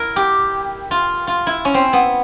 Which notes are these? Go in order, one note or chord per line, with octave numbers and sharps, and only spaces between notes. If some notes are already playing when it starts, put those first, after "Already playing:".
Already playing: E4 A#4
G4
F4
F4
E4
C#4
C4
B3